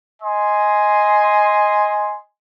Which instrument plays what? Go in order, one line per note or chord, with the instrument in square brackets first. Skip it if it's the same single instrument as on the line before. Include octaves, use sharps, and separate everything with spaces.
[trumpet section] D#5 G#5 C6